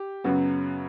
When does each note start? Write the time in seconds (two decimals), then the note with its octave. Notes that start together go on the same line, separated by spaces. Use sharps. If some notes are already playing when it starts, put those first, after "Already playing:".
Already playing: G4
0.24 F#2 C#3 F#3 B3 F#4